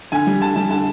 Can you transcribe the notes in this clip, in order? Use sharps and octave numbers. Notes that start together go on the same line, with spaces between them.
D3 G#5
G3
D3 A5
G3 A5
D3 A5